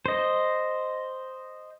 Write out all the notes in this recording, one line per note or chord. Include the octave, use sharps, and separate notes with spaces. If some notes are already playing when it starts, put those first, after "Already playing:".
C5 D#5